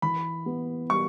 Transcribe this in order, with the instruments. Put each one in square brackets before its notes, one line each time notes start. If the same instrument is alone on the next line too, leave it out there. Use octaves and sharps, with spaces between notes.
[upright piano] E3 [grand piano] B5
[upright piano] B3
[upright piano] G3 [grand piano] C#6